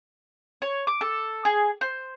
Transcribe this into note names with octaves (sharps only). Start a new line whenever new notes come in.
C#5
D6
A4
G#4
C5